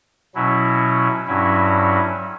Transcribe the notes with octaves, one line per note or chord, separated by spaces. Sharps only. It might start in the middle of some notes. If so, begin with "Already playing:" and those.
B2 F#3 C#4 E4
G2 F#3 C#4 E4